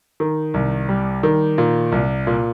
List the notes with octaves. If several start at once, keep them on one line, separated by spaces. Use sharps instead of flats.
D#3
C2
G3
D#3
A#2
C2
A#2